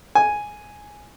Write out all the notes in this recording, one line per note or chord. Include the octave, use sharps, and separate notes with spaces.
G#5